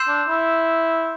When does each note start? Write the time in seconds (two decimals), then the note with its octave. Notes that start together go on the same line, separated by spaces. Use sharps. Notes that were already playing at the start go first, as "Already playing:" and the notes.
Already playing: C6 E6 G6 C7 E7
0.08 D4
0.28 E4